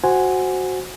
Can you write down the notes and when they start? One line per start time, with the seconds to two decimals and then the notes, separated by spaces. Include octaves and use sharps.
0.04 F#4 C5 F#5 G#5